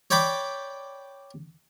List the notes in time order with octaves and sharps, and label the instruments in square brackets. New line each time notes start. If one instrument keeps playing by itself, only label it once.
[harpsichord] C#5 D5 G5 B5 D6